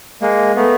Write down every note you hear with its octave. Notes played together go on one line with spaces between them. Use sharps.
G#3 A#3
A3 B3